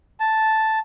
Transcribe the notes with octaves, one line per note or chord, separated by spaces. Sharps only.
A5